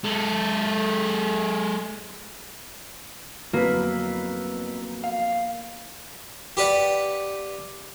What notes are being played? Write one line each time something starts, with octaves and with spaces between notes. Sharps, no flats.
G#3 A4
F2 F#3 A#3 B3 E4 B4
F5
G4 B4 D5 F#5